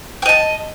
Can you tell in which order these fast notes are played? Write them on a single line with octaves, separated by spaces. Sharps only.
G5 D#5 A5